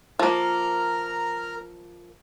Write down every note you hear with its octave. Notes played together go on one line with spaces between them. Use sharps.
F3 A#3 A#4 A#5 F6